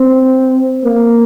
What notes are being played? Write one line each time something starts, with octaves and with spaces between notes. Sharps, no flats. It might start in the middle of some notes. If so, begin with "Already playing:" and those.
Already playing: C4
A#3